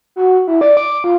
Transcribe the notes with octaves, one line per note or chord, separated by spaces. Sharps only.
F#4
E4
D5
D6
F4